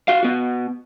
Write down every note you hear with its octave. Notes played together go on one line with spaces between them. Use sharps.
F#4 F5
B3 F#4